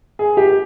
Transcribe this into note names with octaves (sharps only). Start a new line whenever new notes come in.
G#4
G4